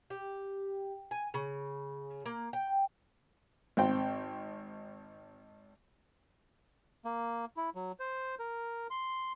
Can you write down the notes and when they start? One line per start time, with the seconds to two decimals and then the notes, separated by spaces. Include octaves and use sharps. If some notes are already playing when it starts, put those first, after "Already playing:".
0.10 G4
1.11 G#5
1.34 C#3
2.26 A#3
2.53 G5
3.77 G#1 C4 G5
7.05 A#3
7.57 E4
7.75 F#3
8.00 C5
8.39 A#4
8.90 C6